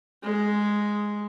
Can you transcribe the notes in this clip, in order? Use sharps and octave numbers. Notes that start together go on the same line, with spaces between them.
G#3